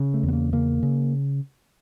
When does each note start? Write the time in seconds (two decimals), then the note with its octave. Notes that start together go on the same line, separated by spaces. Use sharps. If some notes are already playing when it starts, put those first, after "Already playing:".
Already playing: C#3
0.14 A3
0.23 E2
0.28 B3
0.33 A#3
0.53 C#3 A#3
0.83 C#3